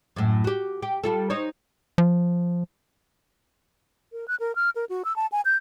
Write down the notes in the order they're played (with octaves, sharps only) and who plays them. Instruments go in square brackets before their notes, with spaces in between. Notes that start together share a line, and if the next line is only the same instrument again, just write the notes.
[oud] F#2 A2
F#4 G4
G4
G3 F4 A4
D#4 C5 C#5
[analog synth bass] F3
[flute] A#4
F#6
A#4
F6
A#4
F#4
E6
A5
G#5
G6